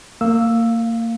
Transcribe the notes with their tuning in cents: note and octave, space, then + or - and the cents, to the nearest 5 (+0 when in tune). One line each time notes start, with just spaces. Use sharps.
A#3 -35 F5 +0 E6 +0